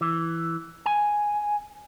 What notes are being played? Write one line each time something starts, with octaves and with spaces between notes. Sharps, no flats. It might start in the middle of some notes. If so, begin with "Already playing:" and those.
E3
G#5